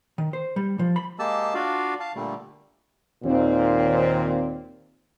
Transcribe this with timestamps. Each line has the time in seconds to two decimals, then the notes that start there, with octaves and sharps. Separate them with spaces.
0.18 D#3
0.33 C5
0.56 G3
0.79 F3
0.96 B5
1.19 G#3 A#3 G4 A5 E6
1.54 D4 F4 F#4 D5 F5
2.00 F5 A5
2.15 A#2 D3 G3 A3
3.24 D#2 A#2 C4